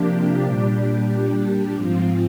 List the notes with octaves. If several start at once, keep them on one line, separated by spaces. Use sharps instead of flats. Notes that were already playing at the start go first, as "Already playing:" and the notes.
Already playing: C3 F3 A#3 D4 G4
A#2 G3 D4 G4
G#2 F3 C4 F4